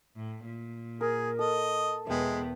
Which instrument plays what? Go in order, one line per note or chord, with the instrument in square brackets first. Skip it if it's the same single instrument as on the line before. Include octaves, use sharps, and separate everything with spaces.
[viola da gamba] A2
A#2
[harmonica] G#4 [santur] A#4
[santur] A4 [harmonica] D#5
[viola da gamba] E2 B2 B3 [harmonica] G#3 [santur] E5 G5